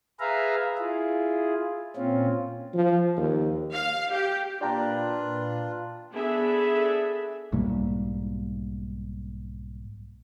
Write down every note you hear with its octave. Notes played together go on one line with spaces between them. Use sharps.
G#4 B4 E5 F5 A#5
E4 F4 G#4
A#2 C4 C#4 F4
F3
D#2
F5
G4
A#2 D4 F4 B4 D5 G5 A#5
B3 D4 G#4 A4 E5
B1 G#2 G3 A#3